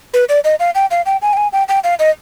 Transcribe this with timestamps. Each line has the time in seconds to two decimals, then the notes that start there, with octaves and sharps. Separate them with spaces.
0.14 B4
0.29 D5
0.44 D#5
0.60 F5
0.75 G5
0.91 F5
1.06 G5
1.22 G#5
1.33 G5
1.37 G#5
1.53 G5
1.68 G5
1.84 F5
1.99 D#5